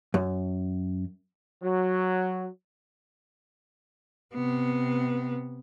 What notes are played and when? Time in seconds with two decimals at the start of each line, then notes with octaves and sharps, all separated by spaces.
0.14 F#2
1.62 F#3
4.34 C3 B3